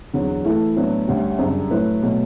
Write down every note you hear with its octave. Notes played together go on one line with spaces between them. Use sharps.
E2 D3 F#3
E3 A3 E4 A4
A2 F#3 B3 D4
D2 D3 G3 C#4
F#2 C#3 G3 D4
A2 F#3 A3 E4 B4
B2 F#3 A3